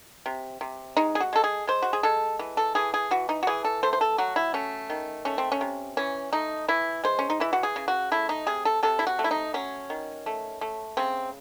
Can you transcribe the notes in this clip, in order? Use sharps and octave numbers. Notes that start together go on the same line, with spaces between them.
C3
C3
G#3 D#4
G#4
F#4
G#3 A4
G#4
G#3 C5
F#4
G#4
G#3 A4
E3
A4
E3 G#4
G#4
E3 F#4
D#4
F#4
E3 G#4
A4
A3 C5
C5
A4
F#3 F#4
E4
A3 C#4
D#3
A3 C#4
C4
C#4
C3
E3 C#4
A3 D#4
E3 E4
G#3 C5
C#4
D#4
E3 E4
F#4
G#4
C#3
F#4
A3 E4
D#4
C3 G#4
A4
C3 A4
E4
F#4
A3
E4
D#4
F#3 C#4
D#3
A3
A3
C#3 C4